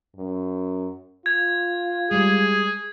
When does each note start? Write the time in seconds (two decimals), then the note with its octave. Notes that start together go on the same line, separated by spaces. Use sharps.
0.16 F#2
1.26 F4 G#6
2.11 G3 G#3 G#4